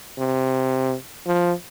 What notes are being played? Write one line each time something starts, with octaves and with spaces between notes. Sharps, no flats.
C3
F3